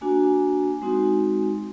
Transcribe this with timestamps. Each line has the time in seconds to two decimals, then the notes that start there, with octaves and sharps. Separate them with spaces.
0.01 A#3 D4 F#4 G#5
0.82 G#3 C4 D#4 F#4